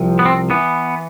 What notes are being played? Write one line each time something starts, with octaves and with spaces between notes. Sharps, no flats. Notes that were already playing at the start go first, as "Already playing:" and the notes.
Already playing: C2 C3 F3
B3
C4
E3 B3